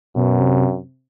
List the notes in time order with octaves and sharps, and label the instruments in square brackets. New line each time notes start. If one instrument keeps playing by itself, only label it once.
[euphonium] F#2 [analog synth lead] B2
[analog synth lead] C3